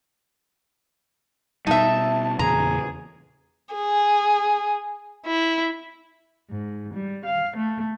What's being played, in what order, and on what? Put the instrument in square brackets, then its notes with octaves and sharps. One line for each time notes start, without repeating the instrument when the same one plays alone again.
[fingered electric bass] B2 G3 [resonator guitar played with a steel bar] D#4 E5 [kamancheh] A5
[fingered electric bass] E2 A#2 C#3 [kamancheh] G#4 [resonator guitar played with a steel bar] A#5
[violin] G#4
E4
[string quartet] G#2
G3
F5
A3